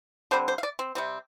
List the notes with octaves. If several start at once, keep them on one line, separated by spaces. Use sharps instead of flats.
D3 G3 C4 C5
C5
F5
D5
C4
C3 G3 C4